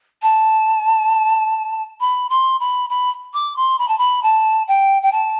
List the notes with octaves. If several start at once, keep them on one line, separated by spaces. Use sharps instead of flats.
A5
B5
C6
B5
B5
D6
C6
B5
A5
B5
A5
G5
G5
A5